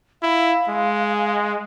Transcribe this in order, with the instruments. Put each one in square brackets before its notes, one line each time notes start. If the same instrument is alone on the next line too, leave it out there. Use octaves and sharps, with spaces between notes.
[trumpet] E4 [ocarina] F5
[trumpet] G#3